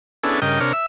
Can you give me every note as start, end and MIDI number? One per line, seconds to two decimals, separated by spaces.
0.23 0.40 59
0.23 0.40 61
0.23 0.40 62
0.23 0.40 64
0.23 0.40 68
0.23 0.40 69
0.42 0.60 43
0.42 0.60 49
0.42 0.60 70
0.42 0.60 75
0.42 0.60 79
0.60 0.73 48
0.60 0.73 62
0.60 0.73 70
0.60 0.73 73
0.60 0.73 89
0.73 0.86 76
0.73 0.86 88